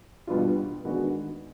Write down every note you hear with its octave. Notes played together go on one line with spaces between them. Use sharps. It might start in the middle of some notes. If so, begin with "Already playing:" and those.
B2 G3 B3 D4 F4
D#3 G#3 B3 D4 F#4